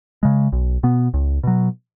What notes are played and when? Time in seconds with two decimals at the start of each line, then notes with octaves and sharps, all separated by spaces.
0.23 C#3 G#3
0.52 B1
0.83 B2 B3
1.14 C#2
1.43 B2 F#3